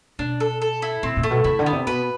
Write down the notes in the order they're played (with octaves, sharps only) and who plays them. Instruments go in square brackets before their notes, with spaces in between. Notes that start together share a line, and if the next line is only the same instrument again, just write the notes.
[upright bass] B2 [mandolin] D4
[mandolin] A4
A4
E4
[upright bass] A#2 [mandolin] C4
[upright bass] A#2
[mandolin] A3
[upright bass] B2
[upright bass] C3 [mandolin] E4
[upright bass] D3
[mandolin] B3
[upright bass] C3
[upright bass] B2 [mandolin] B4